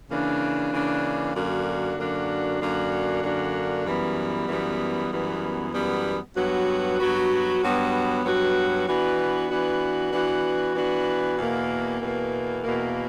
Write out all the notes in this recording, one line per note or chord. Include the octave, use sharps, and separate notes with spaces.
C#3 E3 A#3 D4
C#3 E3 A#3 D4
F#2 D3 A#3 D4 F#4
F#2 D3 A#3 D4 F#4
F#2 D3 A#3 D4 F#4
F#2 D3 A#3 D4 F#4
F#2 E3 G3 B3
F#2 E3 G3 B3
F#2 E3 G3 B3
F#2 E3 G3 B3
G2 F#3 B3 F#4
G2 F#3 B3 F#4
G2 F#3 B3 F#4
G2 F#3 B3 F#4
E3 B3 D4 F#4
E3 B3 D4 F#4
E3 B3 D4 F#4
E3 B3 D4 F#4
E2 B2 A#3
E2 B2 A#3
E2 B2 A#3